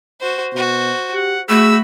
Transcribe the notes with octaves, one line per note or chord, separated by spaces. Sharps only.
F#4 C5
B2 F#4 C5
G4 F#5
A3 F#4 G#4 B5 E6